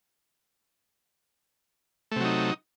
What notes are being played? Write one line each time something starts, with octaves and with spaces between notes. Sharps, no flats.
C3 F#3 A3 D#4